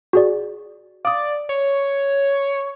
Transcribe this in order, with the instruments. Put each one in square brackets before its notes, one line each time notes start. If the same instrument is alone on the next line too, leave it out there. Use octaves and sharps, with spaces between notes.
[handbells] F#4 G#4 D5
[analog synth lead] D5 [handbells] F5 D#6
[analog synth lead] C#5